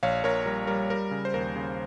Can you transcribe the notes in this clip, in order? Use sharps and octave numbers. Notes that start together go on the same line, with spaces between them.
A#1 C#5 F5
A#1 A#4 C#5
G3 A#4
G3 A#4
G3 A#4
C#3
C5
D#2 A#4
C#3